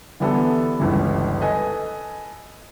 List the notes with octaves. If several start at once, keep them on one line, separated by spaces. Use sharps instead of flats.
D3 E3 G3 B3 E4 A4
G1 C#2 E3
A4 B4 D#5 G#5